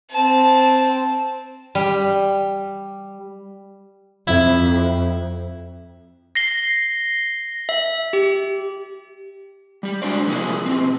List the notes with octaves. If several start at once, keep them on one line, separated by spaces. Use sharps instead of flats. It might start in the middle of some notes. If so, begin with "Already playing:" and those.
C4 A5
G3
F2 E4
A#6 C7 G7
E5
G4
G3 G4
G#3 D4 F#4 C5 D5
C3 F3 A#3 E4 G4 G#4
B2 C4